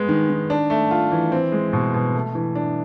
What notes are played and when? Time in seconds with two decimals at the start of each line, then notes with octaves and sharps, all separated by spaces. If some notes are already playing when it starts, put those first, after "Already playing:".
Already playing: G#3 B3
0.09 D#3
0.30 D#3
0.50 D4
0.70 A3
0.91 F4
1.12 E3
1.32 C4
1.52 G#3
1.73 B2
1.94 B2
2.14 A3
2.35 E3
2.55 D4